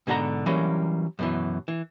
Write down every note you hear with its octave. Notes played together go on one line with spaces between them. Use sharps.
G#2 B2 D3 G#4 F#5 A#5
E3 F#3 G3 A#3 C#4
F#2 B2 E3
E3